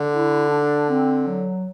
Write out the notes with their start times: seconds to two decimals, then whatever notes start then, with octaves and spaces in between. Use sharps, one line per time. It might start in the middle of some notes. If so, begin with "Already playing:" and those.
Already playing: D3
0.13 E4
0.50 D4
0.88 C4
1.26 F#3